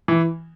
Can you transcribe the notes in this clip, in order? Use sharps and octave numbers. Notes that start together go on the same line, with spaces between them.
E3